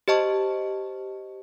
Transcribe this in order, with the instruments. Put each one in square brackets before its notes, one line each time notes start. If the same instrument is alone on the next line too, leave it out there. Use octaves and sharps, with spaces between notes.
[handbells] G4 C5 D#5 A5 C#6